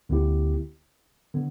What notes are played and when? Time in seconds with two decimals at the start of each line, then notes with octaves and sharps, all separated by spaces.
0.09 D2 D3 B3 E4 G4
1.34 D3 B3